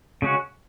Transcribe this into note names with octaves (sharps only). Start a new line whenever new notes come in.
C#3 G#3 C#4 F#4